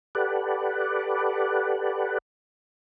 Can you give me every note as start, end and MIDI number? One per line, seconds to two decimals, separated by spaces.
0.15 2.18 67
0.15 2.18 69
0.15 2.18 71
0.15 2.18 74
0.15 2.18 78